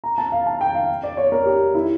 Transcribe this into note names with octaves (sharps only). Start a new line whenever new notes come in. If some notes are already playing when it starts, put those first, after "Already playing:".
A#5
A5
F5
A5
G5
F5
D5
C#5
A#4
G4
E4